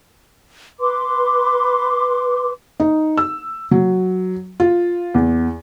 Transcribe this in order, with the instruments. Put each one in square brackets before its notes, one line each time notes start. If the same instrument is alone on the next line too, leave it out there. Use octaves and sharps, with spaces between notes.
[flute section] B4 C6 D6
[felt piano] D#4
E6
F#3
F4
E2